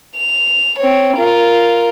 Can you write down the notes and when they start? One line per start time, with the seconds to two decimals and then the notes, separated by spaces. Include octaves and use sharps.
0.17 F7
0.79 C4 C#5
1.17 F4 A#4